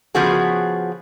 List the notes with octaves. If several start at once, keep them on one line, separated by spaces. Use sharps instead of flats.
C#3 F3 B3 F#4 G#4